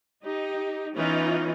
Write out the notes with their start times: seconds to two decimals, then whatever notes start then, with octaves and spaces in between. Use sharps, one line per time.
0.23 D#4 G4
0.95 E3 B3 C#4 D#4 F4